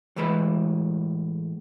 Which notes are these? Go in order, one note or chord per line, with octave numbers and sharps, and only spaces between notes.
A2 E3 G#3 B4 E5 B5